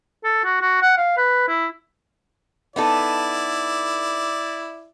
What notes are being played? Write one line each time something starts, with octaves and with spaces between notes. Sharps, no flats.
A4
F#4
F#4
F#5
F5
B4
E4
B3 D#4 E4 A4 D5